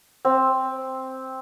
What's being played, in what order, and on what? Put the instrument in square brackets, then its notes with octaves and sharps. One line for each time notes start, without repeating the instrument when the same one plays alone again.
[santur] C4